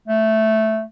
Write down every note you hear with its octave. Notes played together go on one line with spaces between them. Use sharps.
A3